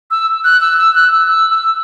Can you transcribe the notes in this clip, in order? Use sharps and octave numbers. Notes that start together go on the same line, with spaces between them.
E6
F#6
E6
E6
F#6
E6
E6
E6